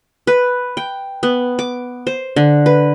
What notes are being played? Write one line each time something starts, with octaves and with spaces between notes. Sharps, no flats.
B4
G5
B3
D6
C5
D3
B4